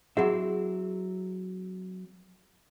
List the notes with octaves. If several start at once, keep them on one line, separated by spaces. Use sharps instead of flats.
F#3 C4 E4 G#4 F#5